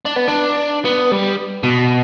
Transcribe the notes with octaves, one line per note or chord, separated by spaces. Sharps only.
D4
B3
D4
B3
G3
B2